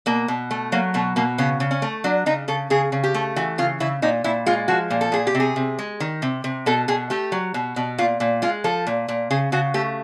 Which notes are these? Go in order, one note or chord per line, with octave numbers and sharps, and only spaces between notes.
B2 A#3
B2
A3
F#3 A#3
B2 A3
B2 A#3
C#3 B3
C#3
C#4
A3
F#3 D4
C#3 D#4
C#3 A4
C#3 G#4
C#3
G4
A3
E3 F#4
C#3 F4
C#3 E4
A#2 D#4
A#2 E4
G#3 F4
F3 F#4
A#2
A4
A#2 G#4
G4
C3
G#4
C3
G#3
D#3
C3
C3
B2 A4
B2 G#4
A3 G4
F#3
B2
B2
A#2 F4
A#2
G#3 F4
F3 A4
A#2
A#2
C#3 G#4
C#3 F#4
A3 G4